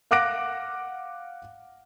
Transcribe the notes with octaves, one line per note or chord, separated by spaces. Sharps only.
F5 F#5 D6 F#6 A#6 D7